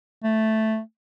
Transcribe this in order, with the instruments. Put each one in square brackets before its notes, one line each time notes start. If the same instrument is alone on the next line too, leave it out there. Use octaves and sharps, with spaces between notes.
[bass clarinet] A3